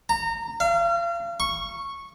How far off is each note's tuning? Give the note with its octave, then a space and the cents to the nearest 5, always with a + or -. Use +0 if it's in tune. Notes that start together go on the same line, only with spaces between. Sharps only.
A#5 -25
F5 -35
C#6 -10